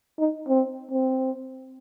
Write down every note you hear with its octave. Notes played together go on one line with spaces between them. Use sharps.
D#4
C4
C4